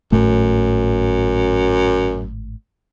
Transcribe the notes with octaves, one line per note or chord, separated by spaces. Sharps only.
G#1 F#2 A2 A3